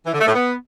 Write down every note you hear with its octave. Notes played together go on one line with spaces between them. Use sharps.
E3
D3
A3
A2
B3